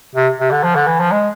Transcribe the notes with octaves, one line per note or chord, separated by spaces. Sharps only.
C3
C3
D3
F3
D3
E3
F3
G#3